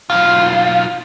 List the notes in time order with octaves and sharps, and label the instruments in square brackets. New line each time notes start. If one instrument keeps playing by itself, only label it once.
[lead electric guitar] B1 F4